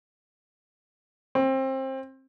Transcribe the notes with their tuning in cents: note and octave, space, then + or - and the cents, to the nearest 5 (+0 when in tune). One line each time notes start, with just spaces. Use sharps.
C4 +25